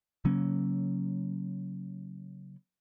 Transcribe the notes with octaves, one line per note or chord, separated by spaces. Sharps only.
C#3 F#3 A#3 C#4